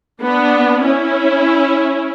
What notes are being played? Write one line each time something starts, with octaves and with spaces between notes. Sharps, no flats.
B3 D4
C#4 E4